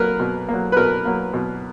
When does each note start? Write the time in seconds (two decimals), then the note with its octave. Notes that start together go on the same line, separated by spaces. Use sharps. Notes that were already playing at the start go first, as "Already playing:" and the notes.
Already playing: F#3 A#3 A#4 B4
0.20 B2
0.49 F#3 A#3
0.72 B4
0.76 B2 A#4
1.05 F#3 A#3
1.34 B2